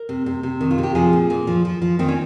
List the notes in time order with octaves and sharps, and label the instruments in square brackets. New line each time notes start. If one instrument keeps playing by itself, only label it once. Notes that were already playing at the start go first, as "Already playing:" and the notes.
Already playing: [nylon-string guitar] A#4
C3
C3
C3
D#3
F4
C3
G4
F3 G#4
A#2
A#2
F3
F3
F3
D#3 C4
C#4